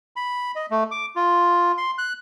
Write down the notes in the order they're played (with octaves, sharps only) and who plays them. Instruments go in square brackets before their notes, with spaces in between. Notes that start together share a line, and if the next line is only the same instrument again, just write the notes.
[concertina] B5
D#5
A3
D6
F4
C6
F#6